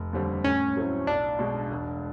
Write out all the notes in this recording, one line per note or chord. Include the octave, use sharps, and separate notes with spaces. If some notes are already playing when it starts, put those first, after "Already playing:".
Already playing: F1
D#2 D3 G3 C4
A2 C#4
F#3 A3 C4 E4
B1 D4
B2 G#3
E1